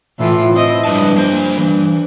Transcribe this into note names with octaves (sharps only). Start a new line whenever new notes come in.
A2 E3 F4
C4 E4 D#5
G2 F3 B4 A5
A#3 C5
G2 E3